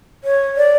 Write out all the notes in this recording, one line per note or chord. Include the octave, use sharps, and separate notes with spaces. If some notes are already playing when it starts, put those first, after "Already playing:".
C#5
D5